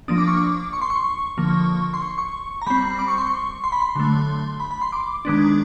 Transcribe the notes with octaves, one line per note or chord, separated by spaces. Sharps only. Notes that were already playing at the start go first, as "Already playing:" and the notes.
F3 A#3 D4 D#6
D6
C#6
D6
C#6
C6
C#6
D3 F3 A#3
C6
C#6
C#6
A#5
G3 C4 B5
D6
C#6
C6
C#6
C6
B5
C6
D3 F#3 A3
B5
B5
C6
D6
D#3 G#3 B3 D4